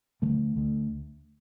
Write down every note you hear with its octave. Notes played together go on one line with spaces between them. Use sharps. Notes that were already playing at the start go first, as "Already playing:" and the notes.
D2 D3 E3 A3
D2 D3